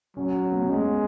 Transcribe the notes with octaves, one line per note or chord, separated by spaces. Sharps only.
F#3 C#4
C#4
B3
C#4
G#3 B3